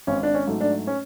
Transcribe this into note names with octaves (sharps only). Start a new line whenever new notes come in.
G#1 C#4
D4
C#4
G#2 F#3 A3
D4
C#4